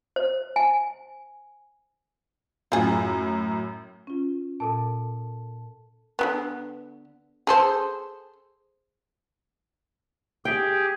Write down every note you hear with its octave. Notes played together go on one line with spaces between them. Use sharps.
C5
G#5
F#2 A2 F4 G#4
C#4 F4
A#2 A4 A#4 A5
D3 G#3 B3
G#4 A4 C5
G4 G#4 G5